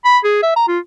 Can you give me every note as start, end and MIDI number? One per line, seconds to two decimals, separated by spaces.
0.05 0.19 83
0.24 0.40 68
0.43 0.53 76
0.56 0.64 82
0.68 0.79 65